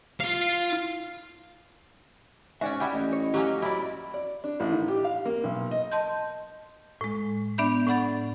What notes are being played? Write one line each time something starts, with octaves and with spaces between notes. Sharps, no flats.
F4 F5
G#2 C#4 F#4 D5 E5 G#5
G3 E4 G4 F#5
A1 D#5
C#5
F#3 A#3 C#4 G4
F#2 F#3 E4 D5 B5
D5
D4
A1
D#3
G4
F5
A#3
B1
D#5
D#5 A5 C6 G6
A2 G#3
B3 D4 D5 E5 B5 G6
A2 D5 F#5 B5 A6